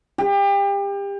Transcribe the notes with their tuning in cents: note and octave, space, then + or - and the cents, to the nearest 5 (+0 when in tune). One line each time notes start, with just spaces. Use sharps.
G4 +30